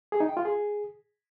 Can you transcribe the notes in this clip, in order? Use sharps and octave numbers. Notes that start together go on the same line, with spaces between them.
G#4
D#4
G5
F4
G#4